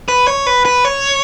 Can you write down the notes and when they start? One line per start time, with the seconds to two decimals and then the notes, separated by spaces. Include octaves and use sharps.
0.09 B4
0.28 C#5
0.46 B4
0.65 B4
0.85 C#5